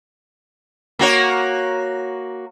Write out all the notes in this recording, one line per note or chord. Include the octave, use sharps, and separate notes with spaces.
A#3 F#4 C#5